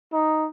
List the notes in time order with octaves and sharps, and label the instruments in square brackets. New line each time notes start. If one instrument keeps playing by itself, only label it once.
[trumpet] D#4